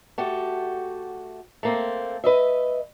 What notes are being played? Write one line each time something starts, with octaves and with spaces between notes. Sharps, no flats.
A3 F#4 G4
A3 A#3 C4
B4 D#5 E5